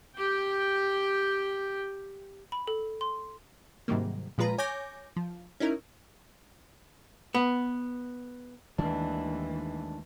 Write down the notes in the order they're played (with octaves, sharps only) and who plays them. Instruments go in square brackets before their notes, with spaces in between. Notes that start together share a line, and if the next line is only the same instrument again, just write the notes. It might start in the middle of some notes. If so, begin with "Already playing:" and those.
[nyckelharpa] G4 G5
[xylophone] B5
A4
C6
[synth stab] G#2 C3 D#3 F#3 G3 A#3
A#2 F3 G#3 F4 B4 A#5
C#5 G#5 D6 G6 A#6
F3
C#4 D#4 E4 A#4
[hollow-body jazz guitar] B3
[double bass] D#2 E3 [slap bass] D#3 G#3 A3 [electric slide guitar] D4